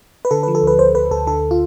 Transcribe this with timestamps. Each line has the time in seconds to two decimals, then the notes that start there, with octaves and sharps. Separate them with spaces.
0.25 B4
0.31 D3 A4
0.43 F3 B4
0.55 A4
0.63 D2 B4
0.79 D2 C5
0.95 D2 B4
1.11 D2 A4
1.27 D3 A4
1.51 F4